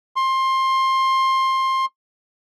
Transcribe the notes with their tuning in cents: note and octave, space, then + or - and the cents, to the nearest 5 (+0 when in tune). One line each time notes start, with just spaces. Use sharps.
C6 +20